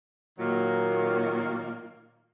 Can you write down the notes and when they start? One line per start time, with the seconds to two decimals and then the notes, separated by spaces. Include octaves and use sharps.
0.38 A#2 D#3 F#3 A#3